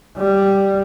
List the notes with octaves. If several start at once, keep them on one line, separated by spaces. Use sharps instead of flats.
G3